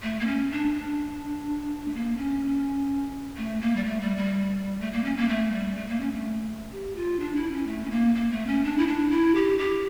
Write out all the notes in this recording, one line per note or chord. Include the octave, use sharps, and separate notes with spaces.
A3
A#3
C#4
D4
D4
A3
A#3
C#4
A3
A#3
G3
A3
G3
G3
A3
A#3
C#4
A#3
A3
G3
A3
A#3
C#4
A3
G4
F4
D4
E4
C#4
A3
C#4
A#3
A#3
A3
C#4
D4
E4
D4
E4
G4
G4